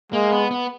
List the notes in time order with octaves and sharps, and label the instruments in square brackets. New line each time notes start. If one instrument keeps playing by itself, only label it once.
[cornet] G#3 [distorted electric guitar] A#3
[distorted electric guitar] B3
B3